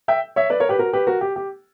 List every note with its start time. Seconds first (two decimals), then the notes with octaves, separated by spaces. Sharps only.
0.08 E5 G5
0.36 C#5 E5
0.50 B4 D5
0.60 A#4 C#5
0.69 G4 B4
0.79 F#4 A#4
0.93 G4 B4
1.07 F#4 A#4
1.21 G4
1.36 G4